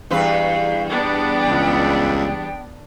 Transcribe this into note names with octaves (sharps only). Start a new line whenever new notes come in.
E2 G2 B4 F5
B3 D4 G5
C#2